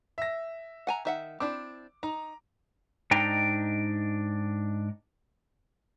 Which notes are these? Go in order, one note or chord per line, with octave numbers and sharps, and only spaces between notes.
E5 A#6
F#5 G#5 A#5
D#3 E5 F#5
C4 D4 E4 D6
D#4 A#5
G#2 D4 D#4 G5 A#5